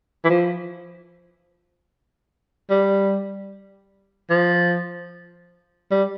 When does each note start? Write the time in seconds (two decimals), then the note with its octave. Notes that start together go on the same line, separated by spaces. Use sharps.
0.25 E3
0.30 F3
2.70 G3
4.30 F3
5.91 G3